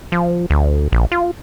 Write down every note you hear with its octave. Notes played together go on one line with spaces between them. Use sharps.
F3
D2
A#1
F4